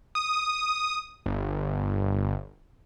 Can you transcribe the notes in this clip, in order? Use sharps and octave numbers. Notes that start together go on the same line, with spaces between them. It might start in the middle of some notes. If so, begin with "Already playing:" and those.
D#6
G1